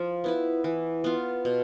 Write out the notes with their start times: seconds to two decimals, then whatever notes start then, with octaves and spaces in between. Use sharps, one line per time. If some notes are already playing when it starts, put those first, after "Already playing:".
Already playing: F3
0.24 B3 E4 B4
0.64 E3
1.04 B3 F4
1.45 B2